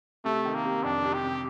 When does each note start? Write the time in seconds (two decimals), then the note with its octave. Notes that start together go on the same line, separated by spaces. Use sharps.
0.25 C3 A3
0.45 D#3
0.55 A#3
0.65 C3
0.84 F2 D4
1.04 C3
1.14 G4
1.24 C3